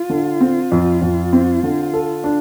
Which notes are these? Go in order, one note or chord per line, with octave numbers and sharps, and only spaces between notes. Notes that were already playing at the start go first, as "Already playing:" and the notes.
Already playing: F4
D3
C4
F2
F2
C4
D3
A4
D4